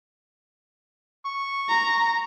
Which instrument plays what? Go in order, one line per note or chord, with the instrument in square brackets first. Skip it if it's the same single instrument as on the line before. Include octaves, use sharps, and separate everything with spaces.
[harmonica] C#6
[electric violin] A#5